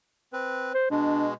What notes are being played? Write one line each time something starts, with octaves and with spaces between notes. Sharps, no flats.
C4 B4
C5
B2 G#3 D4